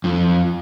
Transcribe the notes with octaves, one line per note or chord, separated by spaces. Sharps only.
F2